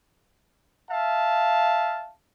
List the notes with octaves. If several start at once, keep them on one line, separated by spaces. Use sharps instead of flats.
E5 F5 A5